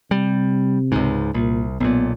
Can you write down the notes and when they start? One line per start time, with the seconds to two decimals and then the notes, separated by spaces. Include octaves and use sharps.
0.11 C3 G3
0.92 C#2 G#2
1.34 C2 A#2
1.80 B1 A#2 B3